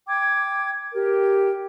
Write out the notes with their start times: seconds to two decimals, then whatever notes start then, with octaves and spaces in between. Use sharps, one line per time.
0.07 G5 D6 G#6
0.93 G4 A#4